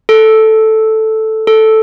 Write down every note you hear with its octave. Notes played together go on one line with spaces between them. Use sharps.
A4
A4